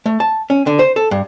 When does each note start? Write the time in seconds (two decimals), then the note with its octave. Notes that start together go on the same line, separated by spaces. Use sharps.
0.06 A3
0.20 A5
0.50 C#4
0.67 D3
0.79 C5
0.96 A4
1.11 G2